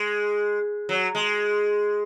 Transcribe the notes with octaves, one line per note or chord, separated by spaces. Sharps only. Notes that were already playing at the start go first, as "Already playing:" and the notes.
Already playing: G#3
F#3
G#3